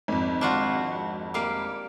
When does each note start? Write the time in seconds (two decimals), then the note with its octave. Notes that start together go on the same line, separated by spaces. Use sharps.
0.08 G#1 F2
0.41 D4 F4 F#4
1.34 G3 A#3 F5